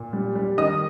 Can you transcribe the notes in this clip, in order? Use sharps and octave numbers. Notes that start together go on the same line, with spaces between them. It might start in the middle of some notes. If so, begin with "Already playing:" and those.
Already playing: A#2
G3
G3
D#3 D#5 D#6